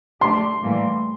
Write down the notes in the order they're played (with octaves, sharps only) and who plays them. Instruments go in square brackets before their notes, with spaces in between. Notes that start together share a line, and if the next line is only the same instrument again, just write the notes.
[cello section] A3 D4 G4 [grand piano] C6
[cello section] A2 E3 G3 A#3